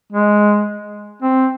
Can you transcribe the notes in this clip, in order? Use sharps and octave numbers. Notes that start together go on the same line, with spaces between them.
G#3
C4